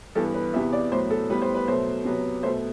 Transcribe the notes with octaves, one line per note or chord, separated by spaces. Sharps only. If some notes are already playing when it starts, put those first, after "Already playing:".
G2 E3 B3 A4
B4
E2 C3 E3 B3 E5
D5
A2 F#3 B3 C5
A4
A2 G3 B3 B4
C5
B4
B2 F#3 A3 C5
C3 F#3 B3
B2 A3 C5